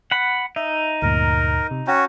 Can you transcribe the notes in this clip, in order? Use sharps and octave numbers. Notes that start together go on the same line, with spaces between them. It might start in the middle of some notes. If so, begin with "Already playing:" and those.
F#5 B5
D#4 E5
D2 G2 A#2 A#4
C3
C#4 F#4 F#5 G5 A#5